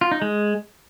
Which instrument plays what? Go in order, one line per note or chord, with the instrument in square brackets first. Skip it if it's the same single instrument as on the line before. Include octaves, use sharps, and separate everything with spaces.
[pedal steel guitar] F4
D#4
G#3